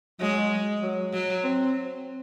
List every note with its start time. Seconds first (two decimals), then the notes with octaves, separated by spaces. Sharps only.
0.20 F#3 G#3
0.82 F#3
1.13 F#3
1.44 C4